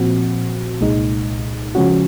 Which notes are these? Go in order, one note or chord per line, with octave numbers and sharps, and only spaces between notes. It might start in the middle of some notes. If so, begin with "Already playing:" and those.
Already playing: A#2 F3 C4 F#4
C2 A#2 G#3 D#4
C#3 F3 G#3 C#4 F#4